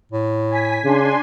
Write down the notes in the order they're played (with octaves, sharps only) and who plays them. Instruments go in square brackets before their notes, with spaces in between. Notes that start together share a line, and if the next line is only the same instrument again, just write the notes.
[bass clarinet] A2
[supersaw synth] G#5 B6
[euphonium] C#3 [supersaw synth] D4 G#5 C6